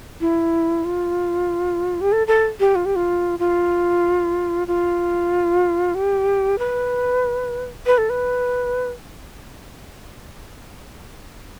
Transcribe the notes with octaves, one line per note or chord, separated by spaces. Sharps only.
E4
F4
G4
A4
A4
G4
F4
G4
F4
F4
F4
G4
B4
B4
A4
B4